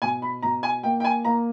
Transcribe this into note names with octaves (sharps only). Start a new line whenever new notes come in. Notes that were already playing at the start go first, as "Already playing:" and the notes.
B2 G#5
B5
B2 A#5
G#5
A#3 G5
G5
G#5
A#3 A#5